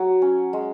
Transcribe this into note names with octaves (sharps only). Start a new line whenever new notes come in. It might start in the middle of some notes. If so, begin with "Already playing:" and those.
Already playing: F#3
C#4
G#3